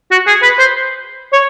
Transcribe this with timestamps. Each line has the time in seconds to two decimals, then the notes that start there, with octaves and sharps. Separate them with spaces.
0.11 F#4
0.27 G#4
0.42 B4
0.59 C5
1.33 C#5